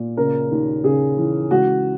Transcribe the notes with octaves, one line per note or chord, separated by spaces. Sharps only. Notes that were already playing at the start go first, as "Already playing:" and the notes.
Already playing: A#2
C#3 A#4
D#2
C#3 G#4
E3
C#2 F#4